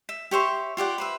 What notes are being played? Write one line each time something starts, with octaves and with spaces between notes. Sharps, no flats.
E5
G4 C#5 E5 C6
F4 G4 D5 F#5
B4 C5 E5